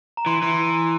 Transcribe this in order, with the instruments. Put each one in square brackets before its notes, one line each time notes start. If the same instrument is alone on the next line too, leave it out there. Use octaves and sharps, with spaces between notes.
[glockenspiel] A#5
[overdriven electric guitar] E3 [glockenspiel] C6
[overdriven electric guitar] E3